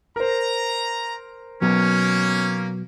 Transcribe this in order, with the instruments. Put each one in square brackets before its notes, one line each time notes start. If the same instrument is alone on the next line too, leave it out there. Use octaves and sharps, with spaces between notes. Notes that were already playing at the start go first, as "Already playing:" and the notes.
[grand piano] A#4 C5 [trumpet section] A#5
[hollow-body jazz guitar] B2 F#3 B3 [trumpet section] A#3 [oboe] C#4